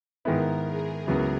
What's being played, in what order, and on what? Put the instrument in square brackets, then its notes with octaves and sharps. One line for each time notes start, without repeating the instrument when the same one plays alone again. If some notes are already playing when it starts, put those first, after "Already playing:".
[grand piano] G#2 D#3 G#3 B3 E4 [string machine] A#4
[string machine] G#4
[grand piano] C#2 C#3 F#3 B3 E4